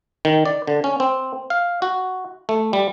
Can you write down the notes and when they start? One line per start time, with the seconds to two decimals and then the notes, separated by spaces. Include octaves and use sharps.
0.25 D#3
0.46 D5
0.67 D3
0.84 C#4
1.00 C4
1.50 F5
1.82 F#4
2.49 A3
2.73 G3